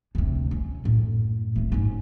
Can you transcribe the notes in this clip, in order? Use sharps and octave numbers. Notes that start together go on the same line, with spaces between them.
D2 C3
C#4
F#2 A2
A3 C4
G#2 C#4